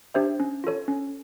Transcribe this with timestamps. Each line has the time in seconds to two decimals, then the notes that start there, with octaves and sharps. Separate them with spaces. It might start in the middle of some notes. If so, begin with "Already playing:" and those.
0.14 D4 G4 C5 E5
0.40 C#4
0.64 F4 A4 C#5
0.88 C#4